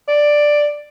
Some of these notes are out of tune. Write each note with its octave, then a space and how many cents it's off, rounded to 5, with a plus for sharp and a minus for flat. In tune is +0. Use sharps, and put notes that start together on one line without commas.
D5 +5